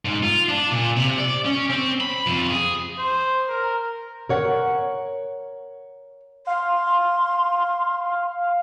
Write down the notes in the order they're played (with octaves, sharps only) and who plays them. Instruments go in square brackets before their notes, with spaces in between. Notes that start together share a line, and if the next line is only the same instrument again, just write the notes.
[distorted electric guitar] G#2
F4
D4
A#2
C3
D5
C#4
C4
B5
F2
G#4
[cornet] C5
A#4
[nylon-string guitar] A#4 C#5 F#5
[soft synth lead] F5 [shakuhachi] C6